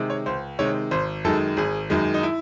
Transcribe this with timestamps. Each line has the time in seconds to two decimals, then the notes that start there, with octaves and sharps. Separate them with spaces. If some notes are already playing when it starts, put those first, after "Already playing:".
Already playing: C3 D#3 G#3
0.10 C#5
0.26 C#2 C5
0.59 C3 D#3 G#3 C#5
0.91 G#1 C5
1.24 F#2 D#3 G#3 A4
1.57 G#1 G#4
1.90 F#2 D#3 G#3
2.14 D#4
2.23 E4